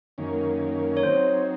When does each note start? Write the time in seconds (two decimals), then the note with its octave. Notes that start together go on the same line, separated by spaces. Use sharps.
0.18 F#2 D#3 A#3 C#4
0.97 C#5
1.03 F#3 C4 D#4 C5